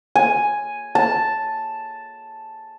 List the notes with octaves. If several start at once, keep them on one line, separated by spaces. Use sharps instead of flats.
G#5
A5